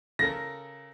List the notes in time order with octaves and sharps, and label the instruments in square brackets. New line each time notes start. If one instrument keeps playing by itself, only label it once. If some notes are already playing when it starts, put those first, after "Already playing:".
[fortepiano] C#3 A4 A#4 [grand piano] A#6